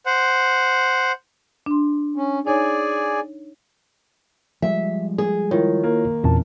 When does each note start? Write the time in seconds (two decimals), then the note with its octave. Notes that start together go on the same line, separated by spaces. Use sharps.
0.06 C5 F#5
1.66 D4 C6
2.16 C#4
2.47 D#4 G#4 C#5 D5 G#5
4.62 F3 G3 G#3 E5
5.18 G#4
5.51 D#3 E4 F4 C#5
5.84 A#3
6.24 E2 A#2 E3 C4 C#4 A5